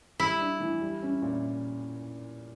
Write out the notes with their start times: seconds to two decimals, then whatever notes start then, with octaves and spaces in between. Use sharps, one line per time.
0.19 G3 E4
0.40 D4
0.60 E3
0.81 G3
1.03 C#4
1.22 A#2